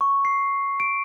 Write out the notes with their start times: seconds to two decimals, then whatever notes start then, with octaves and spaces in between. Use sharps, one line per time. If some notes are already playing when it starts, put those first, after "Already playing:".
0.01 C#6
0.25 C7
0.80 D7